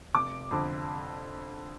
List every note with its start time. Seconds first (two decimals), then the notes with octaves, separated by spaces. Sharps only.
0.14 F1 D6
0.51 F2 D3